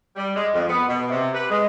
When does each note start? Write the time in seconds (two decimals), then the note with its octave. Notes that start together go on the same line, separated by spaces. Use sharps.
0.16 G3
0.35 G#3
0.53 F2
0.69 B3
0.88 B2
1.10 C3
1.34 B4
1.50 G#3